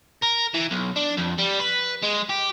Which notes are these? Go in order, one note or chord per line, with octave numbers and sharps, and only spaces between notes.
A#4
E3
B1
D4
F2
G3
B4
G#3
G4